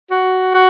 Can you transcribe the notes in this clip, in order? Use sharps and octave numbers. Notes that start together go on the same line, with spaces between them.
F#4
F#4